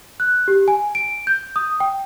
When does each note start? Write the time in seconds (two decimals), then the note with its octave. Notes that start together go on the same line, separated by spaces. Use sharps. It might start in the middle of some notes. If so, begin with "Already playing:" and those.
0.20 F#6
0.48 G4
0.68 G#5
0.95 D7
1.27 G6
1.56 D#6
1.80 G5